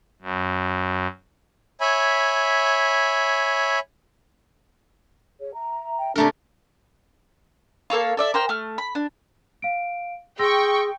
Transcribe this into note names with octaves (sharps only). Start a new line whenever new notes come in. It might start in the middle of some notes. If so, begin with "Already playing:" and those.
F#2
C#5 E5 G#5 B5
G#4 C#5
E5 A#5
G5
C3 A3 D4 G4 A#4 A#5
A#3 A4 C#5 F5
A4 D5 E5
A#4 C5 G5
A3 F6
B5
D4
F5 D7
G#4 G5 C6 C#6 E6 A#6